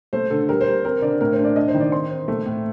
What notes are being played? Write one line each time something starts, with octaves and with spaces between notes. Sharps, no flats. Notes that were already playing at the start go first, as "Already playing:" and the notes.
A3 C5
D3 A4
G3 A#4
C5
G3
C4 A#4
D3 D5
A2 A#4
C5
D4
D5
D4 D#5
C5
D#3
D5
C4 C6
C4
A3
A2